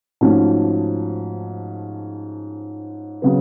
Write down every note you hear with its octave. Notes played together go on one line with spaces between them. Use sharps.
G#2 F3 A3 C#4 F#4
C#3 F#3 B3